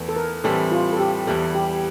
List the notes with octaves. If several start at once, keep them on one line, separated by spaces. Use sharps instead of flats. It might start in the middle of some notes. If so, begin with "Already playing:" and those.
Already playing: E2 E3 A3
A4
A#4
A2 E3 G3 C4 A4
F4
A4
G4
E2 E3 G3 A4
G4